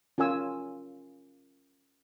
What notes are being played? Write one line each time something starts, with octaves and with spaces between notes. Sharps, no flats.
C#4 F4 A#4 G#5 E6